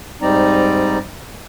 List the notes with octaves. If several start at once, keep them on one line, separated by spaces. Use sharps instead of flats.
G#2 G3 C4 D#4 D5 A#5